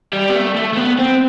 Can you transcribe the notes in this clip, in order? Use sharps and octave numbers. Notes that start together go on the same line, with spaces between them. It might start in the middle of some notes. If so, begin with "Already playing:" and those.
G3
B3
A3
A3
A3
B3
C4